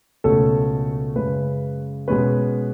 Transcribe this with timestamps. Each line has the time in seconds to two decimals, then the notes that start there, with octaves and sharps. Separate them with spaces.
0.24 C#2 B2 A3 C#4 A4
1.16 F#2 C#3 G#3 C#4 B4
2.08 B2 G#3 C#4 B4